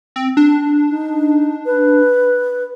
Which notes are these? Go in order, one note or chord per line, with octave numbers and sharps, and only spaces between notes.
C4
D4
D#4
B4